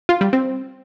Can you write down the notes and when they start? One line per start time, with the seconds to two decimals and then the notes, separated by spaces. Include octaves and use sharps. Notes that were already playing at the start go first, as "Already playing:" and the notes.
0.09 F4
0.21 G3
0.33 C4